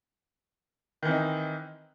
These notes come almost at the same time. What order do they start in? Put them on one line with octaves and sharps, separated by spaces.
D#3 E3 C4 D#4